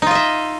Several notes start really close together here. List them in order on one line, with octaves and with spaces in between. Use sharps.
D#4 F4 D#5 E5